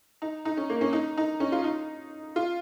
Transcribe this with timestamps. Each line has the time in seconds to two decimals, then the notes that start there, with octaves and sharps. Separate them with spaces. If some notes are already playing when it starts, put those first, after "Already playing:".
0.22 D#4
0.45 D#4
0.57 C#4
0.70 A#3
0.81 C#4
0.93 D#4
1.17 D#4
1.40 C#4
1.52 F4
1.64 D#4
2.36 F4